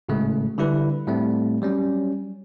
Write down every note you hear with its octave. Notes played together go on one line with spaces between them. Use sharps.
G#1 A2 C#3 G#3 A3
D3 G3 E4 B4
A2 G3 A3 C4
F#3 G3 C#4